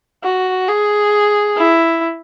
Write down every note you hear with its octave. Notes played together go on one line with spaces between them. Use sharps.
F#4
G#4
E4